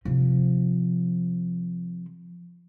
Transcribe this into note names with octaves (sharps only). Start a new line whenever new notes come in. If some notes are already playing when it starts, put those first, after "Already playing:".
C3 F3